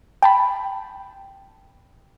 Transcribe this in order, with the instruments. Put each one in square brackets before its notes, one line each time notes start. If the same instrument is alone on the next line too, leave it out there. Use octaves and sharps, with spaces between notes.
[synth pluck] G5 A5 B5